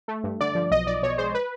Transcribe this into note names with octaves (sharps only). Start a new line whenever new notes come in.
A3
G2
D3 D5
F3
B1 D#5
B1 D5
B2 C#5
G#3 C5
B4